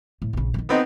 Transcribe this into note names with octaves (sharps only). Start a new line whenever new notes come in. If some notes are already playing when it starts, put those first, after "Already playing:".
A2
A#1 C#3
D3 D#3
B3 C4 D#4